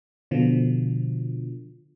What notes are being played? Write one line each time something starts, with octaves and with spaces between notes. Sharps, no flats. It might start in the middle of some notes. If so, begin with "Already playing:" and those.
B2 D3 F3